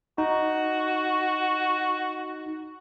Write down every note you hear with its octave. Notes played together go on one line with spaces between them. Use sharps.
D#4 F#4